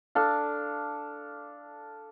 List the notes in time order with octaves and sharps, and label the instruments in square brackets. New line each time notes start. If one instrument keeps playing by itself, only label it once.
[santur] D4 A4 F5